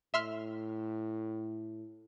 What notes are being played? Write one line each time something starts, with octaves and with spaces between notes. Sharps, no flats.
A2 E5 C6 F6